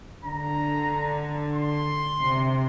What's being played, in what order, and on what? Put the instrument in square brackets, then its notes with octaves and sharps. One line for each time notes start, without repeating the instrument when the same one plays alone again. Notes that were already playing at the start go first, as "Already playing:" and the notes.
[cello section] D3 [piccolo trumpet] A#5
[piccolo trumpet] C6
[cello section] C3